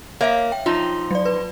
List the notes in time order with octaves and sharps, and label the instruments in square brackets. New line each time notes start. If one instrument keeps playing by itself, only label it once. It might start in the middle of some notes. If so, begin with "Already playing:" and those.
[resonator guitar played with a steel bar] A#3 [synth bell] C#5 E5 F5
[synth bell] G5
[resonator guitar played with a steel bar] F3 D#4 [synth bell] F4
[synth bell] F#3 D5
B4